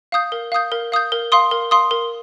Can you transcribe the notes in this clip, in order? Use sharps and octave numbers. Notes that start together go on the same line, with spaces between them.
F5 D#6 G6
A#4
F5 D#6 G6
A#4
F5 D#6 G6
A#4
F5 C6 D#6
A#4
F5 C6 D#6
A#4